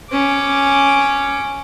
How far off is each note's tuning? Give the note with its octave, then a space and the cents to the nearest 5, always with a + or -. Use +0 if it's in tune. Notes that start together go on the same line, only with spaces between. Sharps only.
C#4 +0 D6 +0